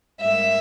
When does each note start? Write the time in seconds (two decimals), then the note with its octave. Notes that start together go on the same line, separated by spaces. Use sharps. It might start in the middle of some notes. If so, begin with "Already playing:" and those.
0.20 G#2 G3 A#3 E5